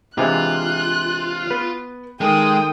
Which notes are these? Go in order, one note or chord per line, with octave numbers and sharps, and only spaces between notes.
C3 E3 G#3 D4 F4 C5 F#6
B3 B4
D#3 G#3 A4 A#4 G5 D#6